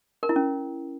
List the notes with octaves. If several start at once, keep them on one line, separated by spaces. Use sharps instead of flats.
A#4
E4
C#4